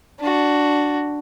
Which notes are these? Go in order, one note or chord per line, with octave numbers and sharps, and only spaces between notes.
D4 F#4